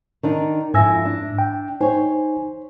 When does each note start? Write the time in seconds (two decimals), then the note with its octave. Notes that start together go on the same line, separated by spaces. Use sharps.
0.23 D#3 D4 D#4
0.74 F2 G#2 E4 G#5 E6 A#6
1.05 D4
1.39 G5
1.81 D#4 C5 C#5 G#5